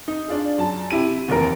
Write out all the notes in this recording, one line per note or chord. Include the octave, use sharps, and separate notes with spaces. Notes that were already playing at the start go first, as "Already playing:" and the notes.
D#4
D4 F4 G#4
F#2 A5
C3 E4 G4 D#7
F1 D#2 E3 A#4